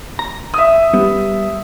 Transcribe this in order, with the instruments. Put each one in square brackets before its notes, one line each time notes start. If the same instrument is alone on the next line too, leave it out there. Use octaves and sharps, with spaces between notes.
[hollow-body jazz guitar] A#5
[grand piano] E5 D#6
[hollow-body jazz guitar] G3 B3